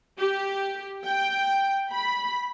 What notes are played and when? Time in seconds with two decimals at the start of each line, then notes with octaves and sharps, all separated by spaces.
0.18 G4
1.04 G5
1.92 B5